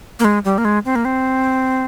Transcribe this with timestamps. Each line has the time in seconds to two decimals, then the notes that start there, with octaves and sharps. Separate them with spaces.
0.20 A#3
0.25 G#3
0.45 G3
0.58 A#3
0.65 G#3
0.85 C4
0.96 A#3
1.05 C4